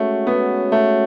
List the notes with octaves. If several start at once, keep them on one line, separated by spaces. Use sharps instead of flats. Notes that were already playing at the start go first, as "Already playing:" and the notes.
Already playing: G#3 A3 C#4 F#4 C#5
B3
A3